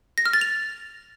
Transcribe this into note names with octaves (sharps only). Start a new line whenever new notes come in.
A#6
F6
A6
F7